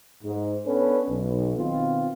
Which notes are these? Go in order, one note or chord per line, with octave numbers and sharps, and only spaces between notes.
G#2
B3 C#4 D4 A4 B4
B1
B2 D#3 C4 F4